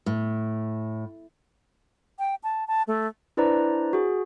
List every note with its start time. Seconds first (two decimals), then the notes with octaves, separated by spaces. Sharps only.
0.06 A2
2.19 G5
2.44 A5
2.68 A5
2.88 A3
3.37 D4 E4 B4 C5 D5 A#5
3.93 F#4 G#4